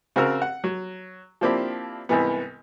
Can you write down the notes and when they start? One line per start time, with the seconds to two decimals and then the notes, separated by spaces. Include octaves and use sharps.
0.16 C#3 C4 F#4 A#4 E6
0.42 F#5
0.64 F#3
1.41 F3 A#3 C4 D4 E4 G4
2.09 C2 G#2 E3 B3